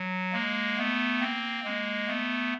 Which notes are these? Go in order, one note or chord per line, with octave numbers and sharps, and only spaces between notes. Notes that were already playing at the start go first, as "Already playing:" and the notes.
Already playing: F#3
G#3 A#3
A3 B3
A#3 C4
G#3 A#3
A3 B3